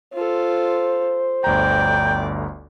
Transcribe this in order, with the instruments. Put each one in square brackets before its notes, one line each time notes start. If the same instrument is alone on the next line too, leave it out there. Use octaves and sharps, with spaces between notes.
[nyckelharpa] F4 A4 [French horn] C5
[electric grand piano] G1 D2 A#5 [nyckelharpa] D5 [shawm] G5